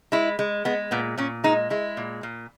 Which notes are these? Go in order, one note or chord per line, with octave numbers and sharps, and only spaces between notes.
G#3 E4
G#3
G#3 B3
A#2 B3
A#2 C#4
G#3 D#4
G#3 E4
A#2
A#2